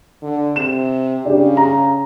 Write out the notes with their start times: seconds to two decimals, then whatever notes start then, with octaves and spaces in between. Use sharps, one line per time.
0.22 D3
0.56 C3 E7
1.25 C#3 D4 G4
1.57 A#5